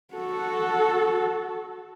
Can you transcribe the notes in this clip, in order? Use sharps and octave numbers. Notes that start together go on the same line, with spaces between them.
F#4 A4